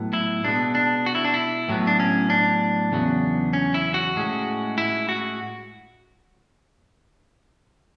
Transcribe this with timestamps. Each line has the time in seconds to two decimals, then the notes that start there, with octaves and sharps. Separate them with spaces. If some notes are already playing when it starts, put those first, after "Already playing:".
Already playing: A2 F#3 B3
0.13 E4
0.44 B2 G#3 B3 D4
0.75 D4
1.06 F#4
1.15 E4
1.25 D4
1.34 E4
1.69 A2 F#3 B3
1.87 D4
2.00 C#4
2.30 D4
2.92 E2 C#3 F#3 B3
3.53 C#4
3.74 E4
3.94 F#4
4.16 A2 G#3 C#4
4.78 E4
5.09 F#4